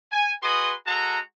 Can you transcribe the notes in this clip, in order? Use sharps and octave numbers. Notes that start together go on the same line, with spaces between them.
G#5
F#4 G#4 B4 D#5 C6 D#6
G#3 F#4 A4 F#5 A#5